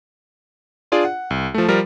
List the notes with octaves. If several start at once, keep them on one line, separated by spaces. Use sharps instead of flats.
D4 F4 G#4 D5
F#5
C2
F3 A3
F3 G3 A#4